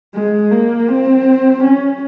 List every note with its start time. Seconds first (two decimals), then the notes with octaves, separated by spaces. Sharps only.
0.15 G#3
0.51 A#3
0.88 C4
1.63 C#4